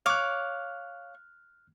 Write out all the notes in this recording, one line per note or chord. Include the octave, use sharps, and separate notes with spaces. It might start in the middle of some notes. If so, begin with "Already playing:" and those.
C#5 F5 D6 F6 F#6